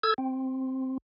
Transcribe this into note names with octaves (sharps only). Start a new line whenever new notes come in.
A4 E6 G#6
C4